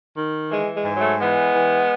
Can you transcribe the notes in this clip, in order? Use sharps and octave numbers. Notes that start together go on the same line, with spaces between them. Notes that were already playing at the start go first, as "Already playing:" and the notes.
D#3
E3 G#3
G#3
G#2
F#3 A3
E3 G#3 B3
E3